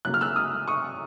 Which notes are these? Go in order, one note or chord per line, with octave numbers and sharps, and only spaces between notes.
C#3 F#3 A#3 F#6
F6
E6 F#6
D#6 F6
C#6 D#6